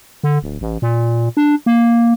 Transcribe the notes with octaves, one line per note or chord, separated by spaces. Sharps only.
D3
D1
A1
A#2
D4
A#3